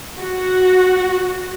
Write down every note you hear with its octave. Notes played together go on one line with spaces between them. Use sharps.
F#4